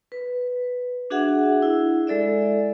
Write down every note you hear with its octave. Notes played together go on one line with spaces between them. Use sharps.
B4
D4 F#4 G#4 E5 F#5
E4
G#3 A4 D5 E5